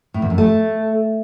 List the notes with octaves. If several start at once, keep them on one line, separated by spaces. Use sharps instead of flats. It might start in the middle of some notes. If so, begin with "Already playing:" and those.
A2
E2
F#2
A3